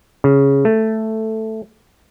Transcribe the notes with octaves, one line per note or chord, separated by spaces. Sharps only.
C#3
A3